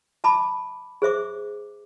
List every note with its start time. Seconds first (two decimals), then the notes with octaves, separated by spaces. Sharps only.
0.24 E5 A5 B5 D6
1.02 G#4 C5 E5 D6